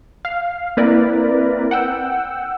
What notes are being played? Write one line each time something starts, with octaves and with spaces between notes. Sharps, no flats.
F5
A#3 C4 E4 A#4 B4 D5
F#5 G5 E6